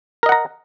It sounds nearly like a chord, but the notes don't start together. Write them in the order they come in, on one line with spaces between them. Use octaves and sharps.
A#4 D#5 F#5 A#5